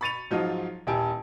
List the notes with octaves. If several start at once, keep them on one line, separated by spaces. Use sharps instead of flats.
B5 C#6 A6 C#7 D#7 F7
G#2 F3 F#3 F4 D#5
D#1 E4 G4 G#5 A5 D7